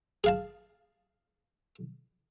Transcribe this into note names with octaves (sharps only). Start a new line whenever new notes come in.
G#4 F5 A5